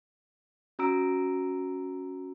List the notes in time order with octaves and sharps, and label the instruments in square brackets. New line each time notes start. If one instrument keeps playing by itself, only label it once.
[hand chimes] C#4 F#4 A#5 E6 D7